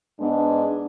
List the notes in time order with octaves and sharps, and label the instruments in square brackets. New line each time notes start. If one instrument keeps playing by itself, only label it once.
[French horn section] G#2 G#3 B3 D4